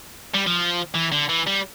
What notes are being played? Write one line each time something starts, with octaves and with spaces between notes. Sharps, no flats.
G3
F3
E3
D3
E3
G3